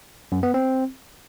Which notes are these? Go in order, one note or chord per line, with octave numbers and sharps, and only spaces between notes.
F#2
B3
C4